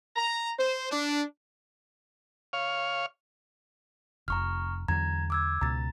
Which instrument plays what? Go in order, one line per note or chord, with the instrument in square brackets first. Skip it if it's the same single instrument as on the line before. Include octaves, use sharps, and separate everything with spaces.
[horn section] A#5
C5
D4
[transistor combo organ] C#5 F5
[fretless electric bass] F1 [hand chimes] A#5 C#6 F6
[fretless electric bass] E2 D3 F#3 [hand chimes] A#5 G#6
[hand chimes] D6 E6 G#6
[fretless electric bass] C#2 B2 [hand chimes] A#5 A6